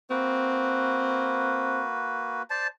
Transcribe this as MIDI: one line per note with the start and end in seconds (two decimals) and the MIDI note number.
0.10 2.42 58
0.10 1.82 60
0.10 2.42 66
0.10 2.42 71
2.50 2.67 72
2.50 2.67 74
2.50 2.67 81